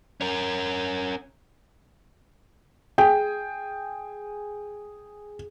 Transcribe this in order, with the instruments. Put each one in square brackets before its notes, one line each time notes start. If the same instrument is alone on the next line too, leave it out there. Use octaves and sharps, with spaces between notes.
[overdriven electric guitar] C#4 A#4
[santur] G#4 [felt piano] G5